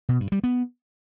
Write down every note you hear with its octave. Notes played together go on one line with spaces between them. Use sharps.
B2
G2
G3
B3